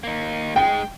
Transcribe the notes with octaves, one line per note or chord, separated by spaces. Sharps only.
A#3 D#4
G#2 G#3 G5